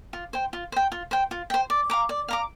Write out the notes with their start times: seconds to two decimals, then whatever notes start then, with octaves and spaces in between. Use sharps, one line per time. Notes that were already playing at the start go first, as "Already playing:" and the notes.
0.13 F4
0.33 C5 G5
0.53 F4
0.72 C5 G5
0.92 F4
1.11 C5 G5
1.31 F4
1.50 C5 G5
1.70 D5
1.90 F5 A#5 D6
2.09 D5
2.28 F5 A#5 D6